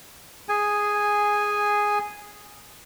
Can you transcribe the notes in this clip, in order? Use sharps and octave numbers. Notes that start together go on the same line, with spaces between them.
G#4 G#5